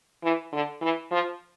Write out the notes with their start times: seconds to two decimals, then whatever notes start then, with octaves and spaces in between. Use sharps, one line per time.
0.23 E3
0.53 D3
0.82 E3
1.11 F3